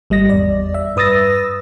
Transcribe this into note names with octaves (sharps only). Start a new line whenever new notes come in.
G#1 G3 D#5 A#6
E2 D5
E5
G2 B4 D#6 E6 A6 A#6